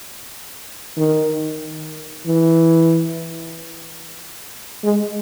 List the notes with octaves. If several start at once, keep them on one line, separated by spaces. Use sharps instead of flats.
D#3
E3
G#3